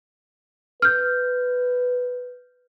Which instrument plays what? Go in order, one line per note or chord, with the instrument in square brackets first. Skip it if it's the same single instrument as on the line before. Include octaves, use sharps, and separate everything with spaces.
[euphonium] B4 [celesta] F6 G6